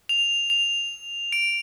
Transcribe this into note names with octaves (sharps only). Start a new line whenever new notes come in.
F7
F7
D7